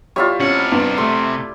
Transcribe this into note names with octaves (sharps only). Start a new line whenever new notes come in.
G3 E4 F4 C#5
C3 C#4 F#5
G2
A3 C6